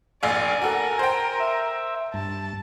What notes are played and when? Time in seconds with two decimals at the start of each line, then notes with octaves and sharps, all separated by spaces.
0.23 F1 A#1 D5 F5 G#5
0.62 F#4 A4 A#4 F#5
0.99 C5 G5
1.40 E5
2.14 G2 A5